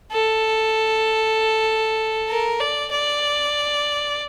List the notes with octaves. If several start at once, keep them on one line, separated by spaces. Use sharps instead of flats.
A4
A#4
D5
D5